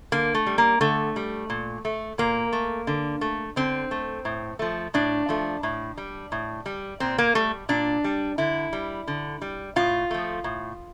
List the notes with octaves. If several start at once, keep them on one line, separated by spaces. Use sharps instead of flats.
D3 A#3
A3
G3
A#3
D3 A3
G3
A#2
A3
A#2 A#3
A3
D3
A3
D3 C4
A3
A2
F3 A3
A2 D4
F3 A3
A2
G3
A2
G3
A#2 C4
A#3
G3 A3
A#2 D4
G3
D3 E4
G3
D3
G3
A2 F4
F3 A3
A2